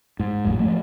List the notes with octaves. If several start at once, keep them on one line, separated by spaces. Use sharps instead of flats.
G#2
G#1 F2 A2
F3 A3 A#3